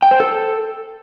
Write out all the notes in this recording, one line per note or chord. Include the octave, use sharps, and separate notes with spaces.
G5
C5
A4